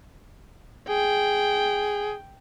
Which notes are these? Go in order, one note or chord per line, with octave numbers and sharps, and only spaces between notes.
G#4 G5